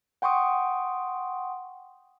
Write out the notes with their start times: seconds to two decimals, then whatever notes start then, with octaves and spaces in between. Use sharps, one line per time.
0.22 F#5 G5 C6 C#6 D#6